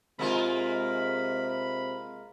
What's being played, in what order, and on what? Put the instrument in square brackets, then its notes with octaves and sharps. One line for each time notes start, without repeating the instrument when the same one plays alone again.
[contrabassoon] C3 [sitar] G#3 A#3 F4 [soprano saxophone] B5